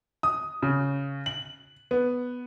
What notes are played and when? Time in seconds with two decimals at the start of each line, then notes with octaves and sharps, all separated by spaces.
0.23 D#6
0.63 C#3
1.26 F#7
1.91 B3